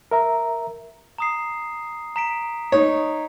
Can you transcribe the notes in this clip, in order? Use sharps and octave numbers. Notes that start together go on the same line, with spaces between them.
A#4 E5 A#5
A#5 D#6 C7
A#5 B6 D7
D#4 C#5